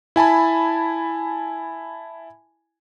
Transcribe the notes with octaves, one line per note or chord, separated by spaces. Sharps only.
E4 G#5 A5 B5